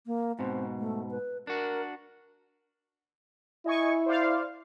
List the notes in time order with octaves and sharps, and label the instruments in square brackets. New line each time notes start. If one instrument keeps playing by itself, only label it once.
[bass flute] A#3
[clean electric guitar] G#2 B2 [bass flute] C4
[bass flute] A3
B4
[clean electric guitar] D4 F#4 [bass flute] A#4
[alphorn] E4 [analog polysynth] D#5 G#5 C#6
[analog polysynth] C5 D5 F5